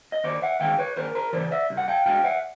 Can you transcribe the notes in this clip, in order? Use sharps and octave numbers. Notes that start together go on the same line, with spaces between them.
D#5
D#2 C5 D5
E5 F#5
D#3 G#3 F5 G5
B4 C#5
D#2 A#4 C5
A#4 C5
C#3 E3 C5 D5
D5 E5
C2
F#5
F5 G5
B2 G#3 F5 G5
E5 F#5